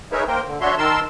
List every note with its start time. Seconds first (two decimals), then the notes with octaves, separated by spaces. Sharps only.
0.12 D#4 G#4 A#4 B4 C#5 E5
0.27 A#3 A#4 C5 G5
0.47 D3
0.61 D4 F#4 C#5 E5 C6
0.78 D#3 A#4 A5 C6 E6